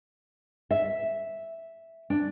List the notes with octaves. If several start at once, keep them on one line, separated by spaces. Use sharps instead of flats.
E5
D4